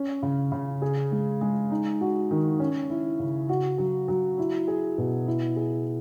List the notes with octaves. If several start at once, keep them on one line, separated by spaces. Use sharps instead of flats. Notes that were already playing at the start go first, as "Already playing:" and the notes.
Already playing: C#4
C#3
C#3
G#4
G#3
G#3
D#4
F#4
D#3
C#4
E4
C#3
F#4
F#3
F#3
E4
G#4
B2
E4
G#4